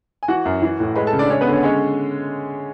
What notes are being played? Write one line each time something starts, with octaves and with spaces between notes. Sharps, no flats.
G#5
E3 F#4 F#5
F#2
E3
A2
G#3 B4 B5
A4 A5
C#3
D4 D5
G#3 C#4 C#5
B3 B4
D3
C#4 C#5
G#3 C#4 C#5